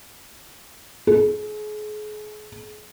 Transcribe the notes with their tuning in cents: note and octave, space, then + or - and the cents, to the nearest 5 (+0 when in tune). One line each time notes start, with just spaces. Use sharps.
G#4 +35